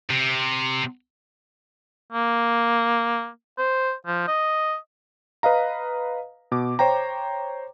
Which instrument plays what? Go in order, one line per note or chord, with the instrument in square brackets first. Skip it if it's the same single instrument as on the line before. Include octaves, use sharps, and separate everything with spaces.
[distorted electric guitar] C3
[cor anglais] A#3
C5
F3
D#5
[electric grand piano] B4 D#5 F5 A#5
B2 D6
C5 C#5 G5 A#5